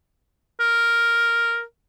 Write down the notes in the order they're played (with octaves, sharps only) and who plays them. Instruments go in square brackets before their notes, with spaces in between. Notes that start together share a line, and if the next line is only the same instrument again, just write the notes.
[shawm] A#4